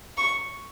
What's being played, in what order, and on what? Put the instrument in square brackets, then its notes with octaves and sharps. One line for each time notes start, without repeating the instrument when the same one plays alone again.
[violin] C#6